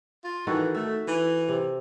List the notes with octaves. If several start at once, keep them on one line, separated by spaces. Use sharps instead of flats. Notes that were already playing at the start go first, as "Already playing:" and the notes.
F4
D#3 E3 F#4 A4
A3 E5
E3
C3